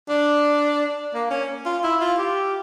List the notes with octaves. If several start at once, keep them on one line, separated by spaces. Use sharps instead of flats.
D4
A#3
C#4
F4
E4
F4
G4